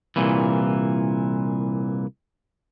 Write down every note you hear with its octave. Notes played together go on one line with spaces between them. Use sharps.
C2 A#2 E3